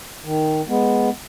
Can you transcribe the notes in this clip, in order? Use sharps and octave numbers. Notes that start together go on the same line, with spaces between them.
D#3
G#3 B3